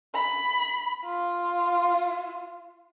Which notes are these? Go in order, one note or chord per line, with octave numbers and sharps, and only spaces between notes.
B5
F4